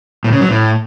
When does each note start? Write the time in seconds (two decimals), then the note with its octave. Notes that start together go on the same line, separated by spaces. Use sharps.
0.24 A2
0.33 C#3
0.41 F#3
0.49 A2